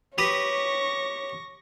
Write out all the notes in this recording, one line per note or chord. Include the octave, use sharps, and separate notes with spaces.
G4 B4 C#5 C#6 D#6 A#6